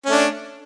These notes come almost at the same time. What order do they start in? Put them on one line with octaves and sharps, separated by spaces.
C#4 A3 D4